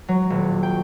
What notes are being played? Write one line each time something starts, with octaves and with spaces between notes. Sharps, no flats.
F#3
D#1
G5